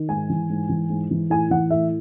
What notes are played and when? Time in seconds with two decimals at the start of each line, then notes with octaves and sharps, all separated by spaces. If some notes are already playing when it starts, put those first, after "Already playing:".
Already playing: D#3
0.09 G#2 G#5
0.30 E3
0.50 G#2
0.69 E3
0.90 G#2
1.11 E3
1.30 A2 G#5
1.50 E3 F#5
1.70 A2 E5